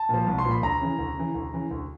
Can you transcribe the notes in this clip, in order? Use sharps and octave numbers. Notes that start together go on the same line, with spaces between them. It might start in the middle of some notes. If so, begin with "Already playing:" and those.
Already playing: A5
A#2 F3
C2
C6
A#2 F3
B5
D2 A#5
C#3 E3
D2
C#3 E3
D2
C#3 E3
D2